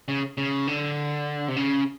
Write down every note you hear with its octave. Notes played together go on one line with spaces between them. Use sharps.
C#3
C#3
D3
C3
C#3